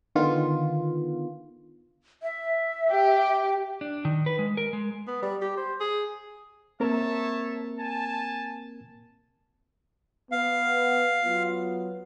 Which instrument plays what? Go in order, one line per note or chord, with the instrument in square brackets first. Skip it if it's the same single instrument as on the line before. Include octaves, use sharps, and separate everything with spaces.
[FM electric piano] D3 D#3 B3 F4
[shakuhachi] E5
[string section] G4
[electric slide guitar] D4
D#3
B4
G#3
A#4
G#3
[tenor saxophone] B3
G3
G4
C5
G#4
[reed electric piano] A#3 C4 A#4 [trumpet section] C#5 E5 A5
[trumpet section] G#5 A5
[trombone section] B3 [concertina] F5
[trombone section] F#3 B3 F4